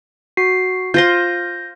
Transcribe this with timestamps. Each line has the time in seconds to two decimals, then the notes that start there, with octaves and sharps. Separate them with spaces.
0.37 F#4 C7
0.94 F4 C5 C6 G6 A#6